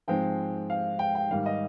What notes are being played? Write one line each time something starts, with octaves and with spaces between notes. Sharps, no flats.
G#2 F3 G#3 C4 G5
F5
G5
G5
G#2 D#3 G3 F5
D#5